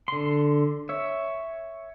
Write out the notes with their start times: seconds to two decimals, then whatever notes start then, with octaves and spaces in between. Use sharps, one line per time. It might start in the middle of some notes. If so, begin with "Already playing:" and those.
0.08 D3 C6
0.89 C#5 E5